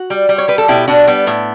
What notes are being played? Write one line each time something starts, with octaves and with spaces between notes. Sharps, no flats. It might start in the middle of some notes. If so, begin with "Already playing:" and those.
Already playing: F#4
G3
G3
C#5
G3 B4
A4
B2 E4 G4
B2 D4 F#4
G3 B3
A2